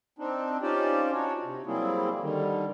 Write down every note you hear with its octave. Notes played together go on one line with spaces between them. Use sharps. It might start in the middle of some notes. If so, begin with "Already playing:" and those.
C4 D4 D#4
C#4 D#4 F4 G4 C5 D5
D4 D#4 F#4 C#5
C3
F#3 G3 A#3 C4 E4 G#4
D3 D#3 G3